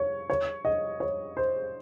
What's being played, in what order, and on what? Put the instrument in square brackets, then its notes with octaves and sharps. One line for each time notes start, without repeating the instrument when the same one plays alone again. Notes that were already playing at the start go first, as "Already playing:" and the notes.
Already playing: [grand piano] C#5
C#5
D#5
C#5
C5